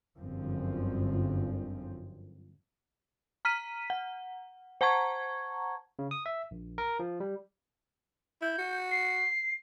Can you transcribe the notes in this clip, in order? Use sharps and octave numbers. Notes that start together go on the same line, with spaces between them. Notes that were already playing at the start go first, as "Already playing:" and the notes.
G1 F#2 F3 C4
A#5 F6 B6 D#7
F#5
C5 F#5 A5 A#5 C#6 G#6
C#3
D#6
E5
A#1
A#4
F3
G3
E4 G6
F#4
C7